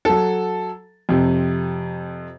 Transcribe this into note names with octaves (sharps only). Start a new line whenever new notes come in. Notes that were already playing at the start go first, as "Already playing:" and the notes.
F#3 A4
F2 C3